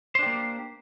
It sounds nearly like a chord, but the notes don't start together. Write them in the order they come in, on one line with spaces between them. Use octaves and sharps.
C5 D4 G4 A#3